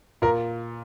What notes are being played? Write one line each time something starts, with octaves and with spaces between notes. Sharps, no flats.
A#2 A#4